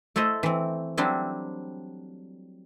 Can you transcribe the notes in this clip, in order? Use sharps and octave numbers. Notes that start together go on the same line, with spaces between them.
A3 E4 A4 C5 D#5
E3 C4
F#3 G3 C4 D4 E4